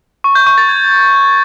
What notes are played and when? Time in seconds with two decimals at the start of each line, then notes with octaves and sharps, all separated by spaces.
0.24 C#6
0.35 G6
0.47 C#6
0.58 A6
0.69 G#6